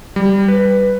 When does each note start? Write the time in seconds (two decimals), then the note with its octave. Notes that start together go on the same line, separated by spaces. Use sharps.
0.16 G3
0.48 B4